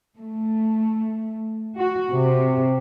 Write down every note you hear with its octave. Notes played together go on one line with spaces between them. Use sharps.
A3
F#4
C3